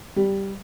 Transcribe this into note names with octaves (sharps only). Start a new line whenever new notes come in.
G3